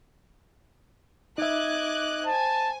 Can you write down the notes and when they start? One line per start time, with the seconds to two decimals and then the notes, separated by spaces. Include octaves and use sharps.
1.38 D#4 D#5 E5 D6 F#6 G#6
2.26 C5 G#5 A5